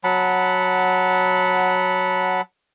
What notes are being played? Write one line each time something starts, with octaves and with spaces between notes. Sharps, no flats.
F#3 F#5 A5 B5